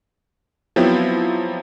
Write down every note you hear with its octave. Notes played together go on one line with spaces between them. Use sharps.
F3 F#3 B3 C4 E4 G4